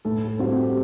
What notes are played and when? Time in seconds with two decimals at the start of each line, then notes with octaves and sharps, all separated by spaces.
0.05 A2 A4
0.28 A4
0.39 G3 C4 F#4
0.52 G4